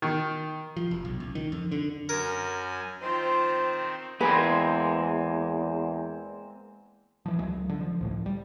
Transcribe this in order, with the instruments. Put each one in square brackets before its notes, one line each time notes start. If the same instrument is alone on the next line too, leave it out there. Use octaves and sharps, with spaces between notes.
[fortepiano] D#3
[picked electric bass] F3
F1
B1
C#2
D#3
F2
D3
[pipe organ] F#2 G#5 [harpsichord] A#4
[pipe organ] D#3 C4 [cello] F4 C5
[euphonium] E2 [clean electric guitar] G#3 A#3 C4 [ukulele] B4
[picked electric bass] E3 F3
C#2 F#3 G#3
D3
F3
C#2 A2 F3
G3